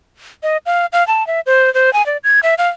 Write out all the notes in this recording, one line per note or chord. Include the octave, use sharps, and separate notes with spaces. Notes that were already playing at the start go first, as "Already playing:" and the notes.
D#5
F5
F5
A5
E5
C5
C5
G#5
D5
G#6
E5
F5